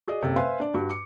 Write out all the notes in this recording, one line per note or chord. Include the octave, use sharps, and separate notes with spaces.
F#4 G#4 D5 D#5
F#1 C3 A4
B4 C5 E5 F5 G#5 C6
D4 D5
G2 F#4
D6 C#7